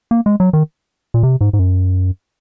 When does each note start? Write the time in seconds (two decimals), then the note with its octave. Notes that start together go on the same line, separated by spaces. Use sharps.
0.11 A#3
0.26 G#3
0.40 F#3
0.53 D#3
1.14 A#2
1.23 C3
1.41 G#2
1.53 G#2
1.59 F#2